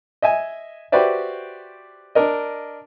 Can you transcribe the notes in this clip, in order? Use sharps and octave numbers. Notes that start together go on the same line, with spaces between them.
D#5 E5 G#5
F#4 G4 B4 C5 D5 E5
D4 A#4 D#5